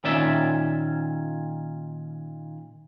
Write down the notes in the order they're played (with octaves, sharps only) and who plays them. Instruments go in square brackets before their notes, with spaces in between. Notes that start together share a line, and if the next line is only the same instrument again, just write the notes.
[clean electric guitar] A#2 D#3 C#4 D5 E5